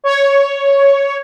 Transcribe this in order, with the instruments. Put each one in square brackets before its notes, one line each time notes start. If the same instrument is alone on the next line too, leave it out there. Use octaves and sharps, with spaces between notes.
[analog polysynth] C#5